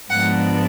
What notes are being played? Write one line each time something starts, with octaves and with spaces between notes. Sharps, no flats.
G#2 F3 G#3 B3 D4 F#5